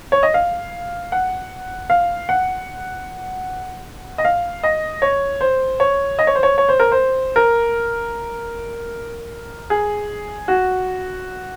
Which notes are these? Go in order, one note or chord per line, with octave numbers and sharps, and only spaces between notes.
C#5
D#5
F5
F#5
F5
F#5
D#5
F5
D#5
C#5
C5
C#5
D#5
C#5
C5
C#5
C#5
C5
A#4
C5
A#4
G#4
F#4